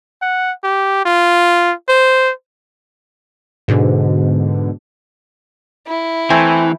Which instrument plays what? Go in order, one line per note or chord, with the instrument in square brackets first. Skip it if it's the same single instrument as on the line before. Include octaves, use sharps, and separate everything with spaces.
[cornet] F#5
G4
F4
C5
[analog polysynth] G#2 B2 D3
[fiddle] E4
[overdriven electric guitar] E3 [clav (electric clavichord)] A3 C4 [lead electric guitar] G#5